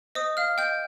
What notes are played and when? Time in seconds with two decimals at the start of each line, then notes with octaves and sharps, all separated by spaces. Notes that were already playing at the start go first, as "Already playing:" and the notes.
0.15 C5 D#5 D#6
0.37 F5 F6
0.58 D#5 G5 G6